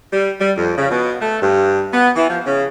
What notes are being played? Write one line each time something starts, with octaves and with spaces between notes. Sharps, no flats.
G3
G3
F2
C#3
B2
A3
G2
B3
E3
F3
C#3